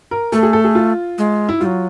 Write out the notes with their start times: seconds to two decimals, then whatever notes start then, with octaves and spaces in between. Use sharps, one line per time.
0.11 A#4
0.32 A3 A4
0.43 G#4
0.53 A4
0.64 G#4
0.75 F4
1.18 G#3
1.49 E4
1.60 G3 F4
1.66 F#3